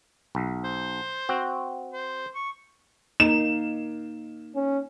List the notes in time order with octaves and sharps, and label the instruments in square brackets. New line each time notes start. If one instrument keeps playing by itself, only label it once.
[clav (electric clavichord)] B1
[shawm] C5
[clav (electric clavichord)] C4 F#4
[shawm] C5
C#6
[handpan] A#3 D#4 [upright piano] E7
[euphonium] C#4